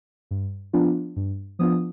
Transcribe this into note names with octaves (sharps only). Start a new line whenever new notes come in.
G2
F3 B3 D4 F4
G2
F3 B3 D4 F4 D#6